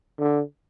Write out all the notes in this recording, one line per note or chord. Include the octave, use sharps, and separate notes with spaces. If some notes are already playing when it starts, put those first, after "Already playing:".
D3